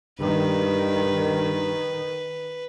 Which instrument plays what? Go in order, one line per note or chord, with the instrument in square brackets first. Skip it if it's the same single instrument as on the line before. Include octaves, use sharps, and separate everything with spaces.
[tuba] G2 [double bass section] D#3 [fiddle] B4